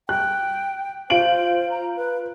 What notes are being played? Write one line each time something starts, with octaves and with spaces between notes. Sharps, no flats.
G5 F#6
F4 C5 D7 F#7
A#5
B4